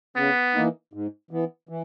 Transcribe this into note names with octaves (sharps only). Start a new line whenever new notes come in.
C#3 B3
E3 A#3 D#4
G#2
E3 B3
E3